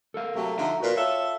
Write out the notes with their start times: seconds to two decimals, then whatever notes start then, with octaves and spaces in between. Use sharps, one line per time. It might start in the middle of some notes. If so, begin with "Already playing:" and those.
0.14 A4 A#4 F5
0.34 C3 F#3 A3
0.57 D3 F3 D#4 E5 F#5 A#5
0.80 A#2 F#4 B4
0.96 F4 A4 C#5 E5